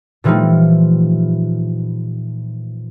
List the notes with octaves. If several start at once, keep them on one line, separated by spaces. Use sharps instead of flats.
A#2 E3 F3 G3 A3 D#4